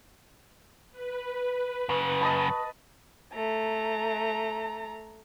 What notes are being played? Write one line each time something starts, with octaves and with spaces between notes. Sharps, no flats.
B4
F#2 C#3 C#6
D#5 A5 B5
A3 A#5